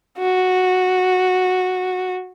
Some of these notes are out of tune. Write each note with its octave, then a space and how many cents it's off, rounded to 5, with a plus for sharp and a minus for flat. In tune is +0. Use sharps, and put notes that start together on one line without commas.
F#4 -10